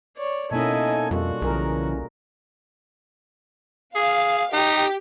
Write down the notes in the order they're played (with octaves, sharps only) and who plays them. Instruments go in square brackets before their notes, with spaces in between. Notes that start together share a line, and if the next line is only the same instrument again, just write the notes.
[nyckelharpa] C#5 D5
[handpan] B2 A#3 C#4 [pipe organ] D#4 A4 G#5 [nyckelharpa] E4 D#5
[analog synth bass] F2 [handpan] G3 F4 A4 [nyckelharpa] F#4
[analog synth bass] B1 [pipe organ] C#3 E3 [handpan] G#4 A#4
[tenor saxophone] G#4 [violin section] F5
[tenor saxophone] D#4 [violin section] G4